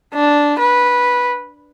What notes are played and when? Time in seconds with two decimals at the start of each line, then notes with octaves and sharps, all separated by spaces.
0.14 D4
0.59 B4